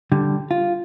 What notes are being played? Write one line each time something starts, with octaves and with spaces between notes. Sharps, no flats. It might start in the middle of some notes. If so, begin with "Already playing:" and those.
D3 G3
F4